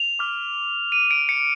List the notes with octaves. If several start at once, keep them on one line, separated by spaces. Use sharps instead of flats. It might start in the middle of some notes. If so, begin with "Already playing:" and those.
Already playing: F7
D6 F6
D#7
D7
C#7